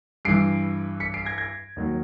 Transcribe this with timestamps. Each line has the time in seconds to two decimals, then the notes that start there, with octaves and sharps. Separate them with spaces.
0.25 G2 E3 C7 D7
1.00 B6 C#7
1.14 C7 D7
1.25 G#6 A#6
1.38 G#6 A#6
1.76 D#2 D#3 F#3